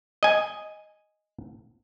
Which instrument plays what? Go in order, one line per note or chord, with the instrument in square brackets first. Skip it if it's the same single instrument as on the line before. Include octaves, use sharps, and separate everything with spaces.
[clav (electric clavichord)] D#5 G#5